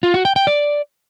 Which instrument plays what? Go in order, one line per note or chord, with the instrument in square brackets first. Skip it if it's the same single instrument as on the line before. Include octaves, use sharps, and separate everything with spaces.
[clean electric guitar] F4
F#4
G5
G5
D5